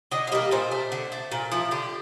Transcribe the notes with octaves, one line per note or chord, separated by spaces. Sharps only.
D3 D#5
F5
G3 A#3 D#5
A#2 C5
A3
D3
A3
A#2
F3 A3
D3 G4